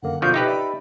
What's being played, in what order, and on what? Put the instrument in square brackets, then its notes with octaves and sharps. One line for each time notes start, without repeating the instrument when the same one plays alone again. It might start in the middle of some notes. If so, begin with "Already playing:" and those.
[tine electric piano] F#2 D3 A#3 [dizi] F#5
[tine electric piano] B2 C#6 [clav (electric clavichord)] D3 F3 [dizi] G6
[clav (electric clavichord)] D#4 G4 B4 [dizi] E5 [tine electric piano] A#6
[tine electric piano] D5 E5 [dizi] B5